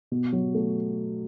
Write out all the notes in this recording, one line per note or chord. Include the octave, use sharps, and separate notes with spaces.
B2
F#3
A3